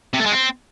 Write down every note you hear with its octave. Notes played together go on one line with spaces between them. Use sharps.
C3
A3
G#3
C4